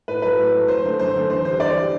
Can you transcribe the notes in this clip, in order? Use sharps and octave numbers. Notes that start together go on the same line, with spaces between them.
A2 B4
F#3 A3 B4
A2
F#3 A3
F#2 C5
D3 A3
F#2 C5
D3 A3
E2 C5
D3 G3 C5
E2 D5
D3 G3